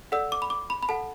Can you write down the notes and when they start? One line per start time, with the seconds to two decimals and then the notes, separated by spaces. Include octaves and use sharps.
0.12 A4 D5 F#5 E6
0.32 D6
0.42 B5
0.50 D6
0.70 B5
0.83 B5
0.89 A4 F#5 A5